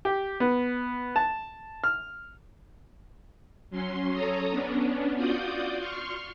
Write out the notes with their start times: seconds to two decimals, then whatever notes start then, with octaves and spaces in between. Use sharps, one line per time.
0.05 G4
0.40 B3
1.16 A5
1.84 F6
3.70 F#3 C#4 C6
4.13 A4 C#5 A#5 D#6
4.50 B3 C#4 D4
5.14 F4 F#4 D5 D#6 G6
5.77 C6 C#6 F6